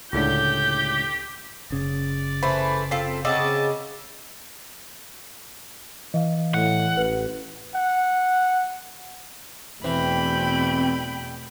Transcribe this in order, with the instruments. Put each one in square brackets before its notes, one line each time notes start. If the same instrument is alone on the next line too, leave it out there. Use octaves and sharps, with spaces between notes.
[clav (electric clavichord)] C#2 A2 D3 [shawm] G4 [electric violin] G6
[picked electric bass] F#1 C#3 [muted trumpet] D5
[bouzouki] E3 A3 [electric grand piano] C5 B5
[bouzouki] C4 F4 A4 [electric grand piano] B6 C7
[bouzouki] C#3 C4 F#4 [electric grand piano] D#5 D6 E6 [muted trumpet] A5
[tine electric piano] E3 [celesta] D#5 F5
[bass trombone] A2 [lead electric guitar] F#5
[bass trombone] A1 [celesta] B4
[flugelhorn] F#5
[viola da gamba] E2 B2 A3 [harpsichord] E3 [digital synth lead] C4 [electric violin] G5 B5